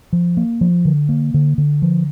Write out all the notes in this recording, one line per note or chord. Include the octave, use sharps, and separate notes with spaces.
F3
A#3
F3
D3
A#3
D3
D3
F3